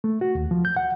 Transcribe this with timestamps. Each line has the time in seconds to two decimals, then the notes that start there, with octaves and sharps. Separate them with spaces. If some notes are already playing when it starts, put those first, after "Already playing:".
0.04 A3
0.21 F#4
0.35 D#2
0.51 F3
0.65 G6
0.77 F#5